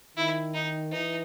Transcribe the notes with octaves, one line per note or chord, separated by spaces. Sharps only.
D#3 E4
D#4
E3 D#4